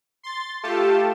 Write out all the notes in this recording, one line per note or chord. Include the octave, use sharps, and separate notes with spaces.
C6 A6
A3 F4 G4 A4 A5